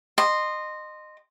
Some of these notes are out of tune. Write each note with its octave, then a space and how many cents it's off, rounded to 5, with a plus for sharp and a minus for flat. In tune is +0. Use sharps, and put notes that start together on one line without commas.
D#5 -20 C6 +0